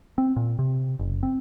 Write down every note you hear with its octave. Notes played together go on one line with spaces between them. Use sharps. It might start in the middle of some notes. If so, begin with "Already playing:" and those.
C4
A#2
C3
F#1
C4